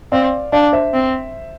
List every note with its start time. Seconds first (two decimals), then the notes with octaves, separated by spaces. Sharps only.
0.12 C4 D5 F5
0.52 D4 D5 F5
0.73 C5 E5
0.94 C4